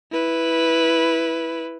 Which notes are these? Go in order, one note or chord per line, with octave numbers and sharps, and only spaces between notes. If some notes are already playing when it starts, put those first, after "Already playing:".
E4 B4